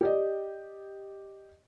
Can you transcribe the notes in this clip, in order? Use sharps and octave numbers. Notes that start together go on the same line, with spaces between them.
G4 D5 D#5